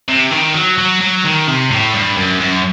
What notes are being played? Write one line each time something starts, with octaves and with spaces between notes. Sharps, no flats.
C3
D#3
F#3
F#3
F#3
D#3
C3
A2
G2
F#2
F#2